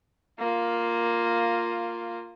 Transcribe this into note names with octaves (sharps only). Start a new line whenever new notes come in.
A#3 F4